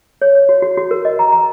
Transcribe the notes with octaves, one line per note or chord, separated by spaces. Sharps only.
C#5
C#5
F#4
F#4
F#4
A#4
D#5
A#5
A#5